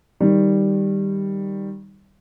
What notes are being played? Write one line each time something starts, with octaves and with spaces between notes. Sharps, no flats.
D#3 G3